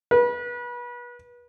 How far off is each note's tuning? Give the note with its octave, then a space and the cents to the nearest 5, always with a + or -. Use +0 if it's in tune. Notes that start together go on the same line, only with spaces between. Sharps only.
B4 -30